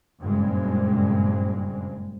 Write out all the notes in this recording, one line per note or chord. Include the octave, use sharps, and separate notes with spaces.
F#1 G2 A#2 G#3 C4